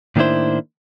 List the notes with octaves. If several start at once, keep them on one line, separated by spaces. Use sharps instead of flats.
A2 D#3 A#3 D4 E4 C5